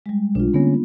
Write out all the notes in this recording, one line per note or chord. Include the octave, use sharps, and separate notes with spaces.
G3 G#3
B1 D4 F4
D3 A#3 B3 C#4